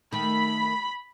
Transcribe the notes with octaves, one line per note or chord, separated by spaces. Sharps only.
D#3 A3 B5